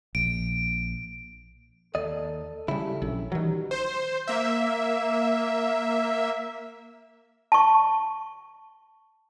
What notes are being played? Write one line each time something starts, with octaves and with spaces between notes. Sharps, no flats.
A#1 D7
D#2 A4 D5 D#5
C#3 G3 E4
A#1 F#3 C#4
D#3 E3 F#3 G3
C5
A#3 E5
A5 C#6